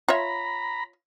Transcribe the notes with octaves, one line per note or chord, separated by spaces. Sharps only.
F4 C#5 E5 A#5 B5